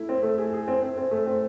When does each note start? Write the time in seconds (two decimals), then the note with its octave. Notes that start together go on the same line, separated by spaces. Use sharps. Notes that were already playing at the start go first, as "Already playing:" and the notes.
Already playing: A3 E4
0.09 C4
0.23 A3
0.38 G#4
0.54 G#4
0.68 C4
0.82 C4
0.97 C4
1.11 A3
1.26 C4